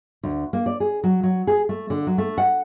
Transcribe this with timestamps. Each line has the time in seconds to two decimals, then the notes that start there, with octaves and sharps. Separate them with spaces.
0.23 D2
0.53 A#3
0.66 D5
0.80 G#4
1.04 F#3
1.23 F#3
1.47 G#4
1.69 A3
1.90 D3
2.07 F#3
2.18 A3
2.38 F#5